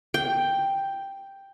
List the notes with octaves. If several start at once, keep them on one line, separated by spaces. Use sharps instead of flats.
G5